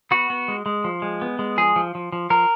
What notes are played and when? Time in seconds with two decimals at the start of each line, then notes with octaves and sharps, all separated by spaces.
0.11 B3 F#4
0.30 B3
0.48 G#3
0.66 G#3
0.84 F3
1.02 G#3
1.22 B3
1.39 G#3
1.57 F3 G#4
1.76 F3
1.95 F3
2.12 F3
2.30 F3 A#4